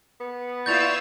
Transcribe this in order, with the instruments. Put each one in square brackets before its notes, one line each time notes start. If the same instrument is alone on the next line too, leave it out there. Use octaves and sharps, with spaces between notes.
[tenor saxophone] B3
[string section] E4 F4 E6 [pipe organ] D5 C#6 [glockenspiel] G6 A6 F7